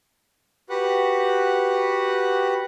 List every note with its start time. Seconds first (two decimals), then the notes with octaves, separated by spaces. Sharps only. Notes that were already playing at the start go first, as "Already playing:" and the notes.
0.70 F#4 G4 B4 F#5 F#6